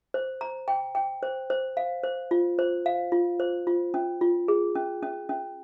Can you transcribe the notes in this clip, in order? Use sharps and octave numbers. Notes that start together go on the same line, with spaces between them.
C5
A#5
G5
G5
C5
C5
F5
C5
F4
C5
F5
F4
C5
F4
C#4
F4
G#4
C#4
C#4
C#4